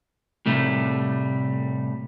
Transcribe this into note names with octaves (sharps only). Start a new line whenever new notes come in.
A2 C3 G3 A3